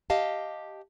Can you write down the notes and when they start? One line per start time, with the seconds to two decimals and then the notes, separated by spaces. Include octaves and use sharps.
0.10 G4 D#5 F5 A5